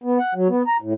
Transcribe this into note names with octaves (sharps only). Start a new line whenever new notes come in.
B3
F#5
F#3
B3
A#5
A2